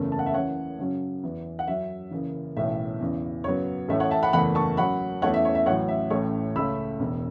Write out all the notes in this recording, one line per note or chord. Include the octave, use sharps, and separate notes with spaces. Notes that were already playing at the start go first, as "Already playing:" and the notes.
Already playing: F#1 E2 C#3 A3 C#4
A5
F#5
E5 A5
F#2 C#3 E3 C#5 F#5
F#2 C#3 F#3 C#4
E2 E3 B3
F#5
F#2 F#3 C#4 E5
F#1 F#2 C#3 E3
B1 A2 E3 C#4 E5
E2 C#3 E3
F#2 C#3 F#3 B3 C#5
A1 A2 A3 C#4 E5
C#5 F#5
E5 A5
F#5 B5
F#1 E2 E3 A3 F#5 B5
A5 C#6
F#2 F#3 C#4 F#5 B5
E2 E3 A3 C#4 C#5 F#5
E5
C#5
E5
A1 A2 F#3 C#5 F#5
E5
A1 A2 A3 C#4 C#5
C#2 C#3 A3 C#4 B5 E6
E1 E2 B2